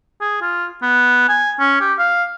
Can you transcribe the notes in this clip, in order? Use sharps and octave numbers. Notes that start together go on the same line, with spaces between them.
G#4
F4
B3
G#5
C#4
G4
F5